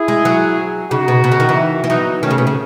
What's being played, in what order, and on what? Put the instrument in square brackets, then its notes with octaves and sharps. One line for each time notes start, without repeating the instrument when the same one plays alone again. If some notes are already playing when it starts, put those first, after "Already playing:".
Already playing: [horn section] E4 G#4
[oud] G#3
F#3
[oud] C#3 [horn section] D#4 F#4
[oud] B2
B2
C#3
D#3
E3
E3
[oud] F#3 [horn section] B3 D#4
[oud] D#3 [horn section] A3 C#4
[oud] C#3
B2
C#3